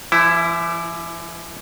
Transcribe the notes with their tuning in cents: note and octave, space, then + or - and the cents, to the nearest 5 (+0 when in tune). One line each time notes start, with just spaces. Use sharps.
E3 +45 E4 +0